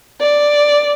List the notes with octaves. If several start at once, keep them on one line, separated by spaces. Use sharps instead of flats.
D5